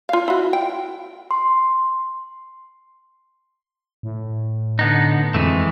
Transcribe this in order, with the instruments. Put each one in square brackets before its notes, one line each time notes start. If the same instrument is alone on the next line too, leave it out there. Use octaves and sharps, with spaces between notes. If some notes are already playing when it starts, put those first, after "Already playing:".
[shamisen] F4 F5
E4 F#4
G5
[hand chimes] C6
[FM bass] A2
[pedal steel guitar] D3 B3 D#4
[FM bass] F2 [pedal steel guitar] E3 G#3 A3